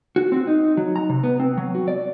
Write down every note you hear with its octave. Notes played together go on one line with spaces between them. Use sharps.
F#4
C4
D#4
F#3
A#5
C3
B3
C4
F#3
F#4
D5